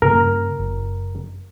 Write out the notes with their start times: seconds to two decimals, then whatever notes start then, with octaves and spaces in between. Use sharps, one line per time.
0.02 G2 C#3 A#3 A#4
0.59 F#1